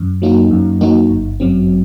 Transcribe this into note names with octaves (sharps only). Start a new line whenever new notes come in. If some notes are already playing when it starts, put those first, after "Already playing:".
Already playing: F#2
F#3 A#3 D#4 F#4
F#2
F#3 A#3 D#4 F#4
G1
F#2 F#3 C4